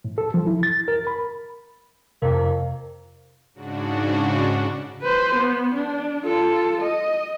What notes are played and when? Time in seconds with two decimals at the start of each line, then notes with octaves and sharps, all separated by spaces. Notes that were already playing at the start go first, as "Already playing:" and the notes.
0.05 A2
0.18 A4
0.34 F3
0.47 E4
0.63 A6
0.88 A#4
1.07 B5
2.22 F2 C3 A#3
3.54 G#2 C#3 D4 F#4
5.02 B4 C5
5.36 B3
5.74 D4
6.26 F4 A4
6.82 D#5